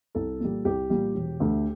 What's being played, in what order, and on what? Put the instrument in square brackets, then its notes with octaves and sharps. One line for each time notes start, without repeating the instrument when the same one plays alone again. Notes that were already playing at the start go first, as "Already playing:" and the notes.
[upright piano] C2 A4
A#2 G3
C2 G4
A#2 G3
E1
D2 D3 A3